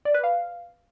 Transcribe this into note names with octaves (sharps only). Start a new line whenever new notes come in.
D5
B4
F5